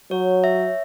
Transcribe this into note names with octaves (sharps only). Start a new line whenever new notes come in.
F#3 C#5
E5